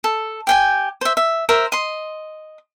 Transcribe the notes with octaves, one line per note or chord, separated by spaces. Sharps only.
A4
G4 G5 G#5
C5 E5
E5
A#4 C5 E5
D#5 C6